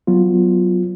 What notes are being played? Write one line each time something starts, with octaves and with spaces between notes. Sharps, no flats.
F#3 B3 F4